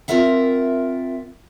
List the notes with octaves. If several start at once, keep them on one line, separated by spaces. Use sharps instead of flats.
C4 F4 A#4 E5 F#5